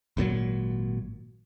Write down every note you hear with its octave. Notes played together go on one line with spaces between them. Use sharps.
G#1 G2 A#2 F#3